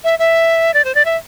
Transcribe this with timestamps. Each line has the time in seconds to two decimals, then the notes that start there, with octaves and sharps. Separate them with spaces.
0.04 E5
0.19 E5
0.74 D5
0.85 C5
0.95 D5
1.05 E5